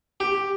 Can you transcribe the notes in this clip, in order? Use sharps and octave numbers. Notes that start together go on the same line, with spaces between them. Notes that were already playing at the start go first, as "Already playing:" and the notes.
G4